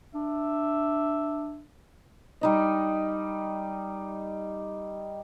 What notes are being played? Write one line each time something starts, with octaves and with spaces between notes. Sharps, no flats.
D4 E5
G3 D#4 D#5